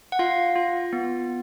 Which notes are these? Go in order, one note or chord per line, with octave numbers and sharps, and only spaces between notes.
F#5
F4 F5
F4
B3